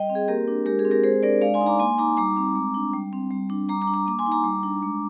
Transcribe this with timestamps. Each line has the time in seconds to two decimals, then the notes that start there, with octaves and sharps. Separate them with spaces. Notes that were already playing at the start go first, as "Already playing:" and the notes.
Already playing: G3 D#5 G5
0.09 C4
0.15 G#4
0.28 A#3 G4 A#4
0.48 D4
0.66 G#3 G4 A#4
0.79 G#4
0.85 C4
0.91 G4 A#4
1.04 G#3 G#4 C5
1.23 D4 A#4 D5
1.41 G#3 D5 F5
1.54 G#5 C6
1.61 D#4
1.66 A#5 D6
1.80 A#3 G#5 C6
1.98 D#4 A#5 D6
2.17 G3 A#5 D6
2.37 C4
2.55 G#3
2.74 D4
2.93 G3
3.13 C4
3.31 G3
3.50 D4
3.69 G3 A#5 D6
3.82 A#5 D6
3.87 D4
3.94 A#5 D6
4.06 A#3 D6
4.19 G#5 C6
4.26 D#4
4.32 A#5 D6
4.44 G3
4.63 D4
4.83 G#3